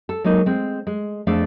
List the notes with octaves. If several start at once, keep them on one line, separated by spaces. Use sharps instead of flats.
A4
F#3 G#3 A#3 D#4
G#3 C4
G#3
F2 A3 D4 G#4 A4 F5